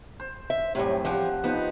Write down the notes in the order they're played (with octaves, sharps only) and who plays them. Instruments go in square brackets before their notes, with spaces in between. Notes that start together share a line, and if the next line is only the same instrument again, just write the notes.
[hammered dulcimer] C5
[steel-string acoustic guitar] E5
[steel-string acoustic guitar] F#2 A2 [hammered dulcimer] C3 G3
[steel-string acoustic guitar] E2 F3 [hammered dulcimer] G4 F#5 G5
[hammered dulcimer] F3 B4 C5 [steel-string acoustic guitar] B3 D#4